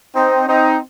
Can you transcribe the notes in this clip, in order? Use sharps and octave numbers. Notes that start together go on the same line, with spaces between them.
C4 D#4
C4 D#4